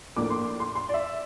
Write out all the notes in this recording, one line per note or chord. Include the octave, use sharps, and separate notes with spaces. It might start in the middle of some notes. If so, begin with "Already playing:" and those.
A2 F3 A#3 D4 D6
C6
C6
C6
D5
E5